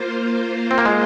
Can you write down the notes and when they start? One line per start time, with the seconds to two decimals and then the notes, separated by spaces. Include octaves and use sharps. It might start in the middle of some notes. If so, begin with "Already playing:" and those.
Already playing: A#3 F4 C5
0.71 C4
0.78 A#3
0.85 G#3